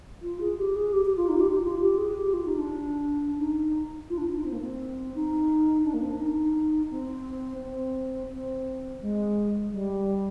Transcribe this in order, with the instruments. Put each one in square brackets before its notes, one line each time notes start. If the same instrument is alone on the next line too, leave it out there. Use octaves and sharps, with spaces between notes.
[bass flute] F4
G#4
G4
G#4
G4
G4
F4
D#4
G4
G4
F4
G4
G#4
G4
F4
D#4
D4
D#4
F4
D4
D#4
C4
A#3
C4
D#4
D4
A#3
C4
D4
D#4
C4
C4
C4
G#3
G3